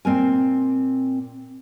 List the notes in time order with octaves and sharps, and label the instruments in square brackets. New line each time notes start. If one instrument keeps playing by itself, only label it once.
[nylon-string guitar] A#2 C4 A#4 G#5